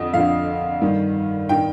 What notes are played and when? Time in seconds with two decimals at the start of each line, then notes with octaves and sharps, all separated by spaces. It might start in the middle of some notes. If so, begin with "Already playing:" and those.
Already playing: F2 D3 F3 D#5
0.14 F2 D3 F3 F5
0.82 G2 D#3
1.49 D#3 G5